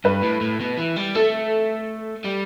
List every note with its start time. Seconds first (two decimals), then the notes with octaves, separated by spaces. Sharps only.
0.05 G2 B4
0.23 A2
0.41 A2
0.60 B2
0.78 E3
0.96 G3
1.15 A3 A4
2.24 G3